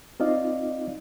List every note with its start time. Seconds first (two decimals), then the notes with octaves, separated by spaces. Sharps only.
0.20 C4 D#4 F4 D5 D#5 F5